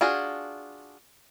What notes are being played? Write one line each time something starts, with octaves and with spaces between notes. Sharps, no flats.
D4 F4 F#4 G#4